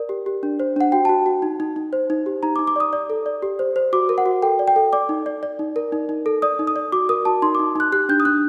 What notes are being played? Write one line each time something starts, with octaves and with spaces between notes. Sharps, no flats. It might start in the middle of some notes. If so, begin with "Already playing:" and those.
Already playing: A#4 D5
G4
G4
D4
C5
D4 F#5
F#4 G5
A5
F#4
F#4
D#4
D#4
D#4
C5
D#4
G4
D#4 A#5
D6
D#4
D6
D5 D#6
D5
A4
D5
G4
C5
C5
F#4 D6
A#4
F#5
F#4
A4 G5
D5
G5
A4
D5 D6
D#4
D5
D5
D#4
A#4
D#4
D#4
A4
D5 D#6
D#4
D#6
D5
F#4 D6
A#4 D#6
F#4 A5
D#4 C6
D6
D#4
D#4 F#6
G4 F#6
D4 G6
D#6
D4 F#6